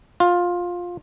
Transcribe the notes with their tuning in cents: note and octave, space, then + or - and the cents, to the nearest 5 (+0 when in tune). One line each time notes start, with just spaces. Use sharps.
F4 +15